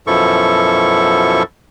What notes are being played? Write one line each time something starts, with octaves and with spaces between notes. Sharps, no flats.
F#2 B2 F3 E4 A4 C#6